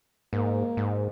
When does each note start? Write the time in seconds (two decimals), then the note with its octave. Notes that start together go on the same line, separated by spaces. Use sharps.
0.33 G#2 A#3
0.77 G#2